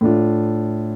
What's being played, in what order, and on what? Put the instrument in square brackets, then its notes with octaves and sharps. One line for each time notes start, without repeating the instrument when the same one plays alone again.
[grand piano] A2 A3 D4 F4